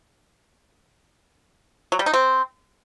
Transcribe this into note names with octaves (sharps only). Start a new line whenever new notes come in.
F#3
G3
D#4
C4